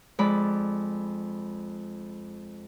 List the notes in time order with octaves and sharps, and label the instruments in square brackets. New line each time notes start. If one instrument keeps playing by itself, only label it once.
[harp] F2 G#3 D5 B5